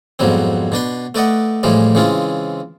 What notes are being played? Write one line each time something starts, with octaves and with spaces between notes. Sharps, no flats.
F2 G#2 B2 F#3 G3 C4
B2 D4 B4 C6
A3 B4 D5 D#5 F#5
A2 E3 F3 G3 G#3
C#3 E3 G#3 C4 F4